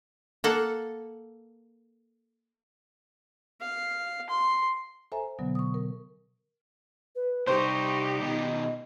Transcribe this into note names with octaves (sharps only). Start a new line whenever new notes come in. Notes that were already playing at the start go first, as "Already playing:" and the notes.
A#3 A4 F#5
F5
C6
A4 C5 E5 G#5 A#5
B2 D3 F#3 B3
C#6 D#6
A#4
B4
C3 G3 D#4 G4 C5 C#6
B2 D#3 D#5